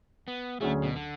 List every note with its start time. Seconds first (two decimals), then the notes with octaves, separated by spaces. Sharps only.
0.28 B3
0.60 D2 D3 F#3 A3 C#4 G#4
0.83 B2
0.95 D3